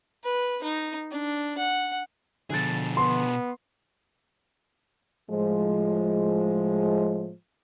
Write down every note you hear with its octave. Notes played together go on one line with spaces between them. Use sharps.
B4
D#4
D4
F#5
B2 D3 F3 G#4 A4
B3 C6
A2 F3 G#3